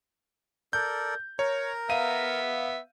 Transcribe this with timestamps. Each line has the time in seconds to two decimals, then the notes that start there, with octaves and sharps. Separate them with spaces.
0.73 A4 A#4 D5 G6
1.39 A#4 C#5 A#5
1.90 B3 E5 F5 D#7